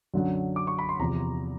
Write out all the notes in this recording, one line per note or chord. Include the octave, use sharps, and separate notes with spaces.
F#2 D3 F#3
D6
C#6
B5
C6
E2 C3 F3 A#5